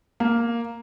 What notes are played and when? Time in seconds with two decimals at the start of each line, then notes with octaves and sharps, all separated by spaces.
0.20 A#3